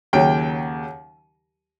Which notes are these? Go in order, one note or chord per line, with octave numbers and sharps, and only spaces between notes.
D#2 C#3 F#3 G5